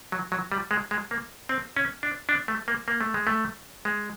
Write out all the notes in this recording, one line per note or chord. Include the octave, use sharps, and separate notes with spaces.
F#3
F#3
G3
G#3
G#3
A#3
C4
C#4
D4
D4
A3
A#3
A#3
A3
G#3
A3
G#3